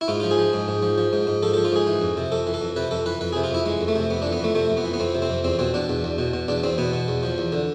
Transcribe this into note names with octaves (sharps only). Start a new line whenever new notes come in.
E4
G#2 F4
F3 F4
G#4
F3
G#2
G#2
F3
F3
G#2
G#2
F3 A4
A4
F3
F4
G#2 G#4
E3
F2
C3
F2 A4
E3
A4
F2
C3 B4
F2 A4
E3 B4
F2 B4
G#4
C3
F4
F2 E4
E3 G#3
F2
A3
C3
F2 B3
D4
E3
B3
F2 A3
C3 A3
F2
B3
E3
B3
F2 C4
C3
C4
F2
E2 C4
B2 C4
B2 D4
E2
E2
B2
B2
E2 D4
E2 C4
B2 B3
B2
E2
F3
E2
D3